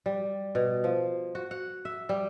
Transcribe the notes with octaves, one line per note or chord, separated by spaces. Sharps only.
G3
B2
F3
F#4
F#5
E5
G3